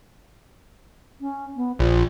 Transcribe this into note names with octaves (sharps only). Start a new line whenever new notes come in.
C#4
B3
A#1 F4